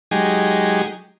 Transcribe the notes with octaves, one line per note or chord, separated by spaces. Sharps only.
F#3 G#3 D#4 G4 G#4